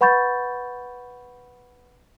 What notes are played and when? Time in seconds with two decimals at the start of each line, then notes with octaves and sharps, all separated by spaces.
0.01 B4 F#5 B5 C#6 G6 A6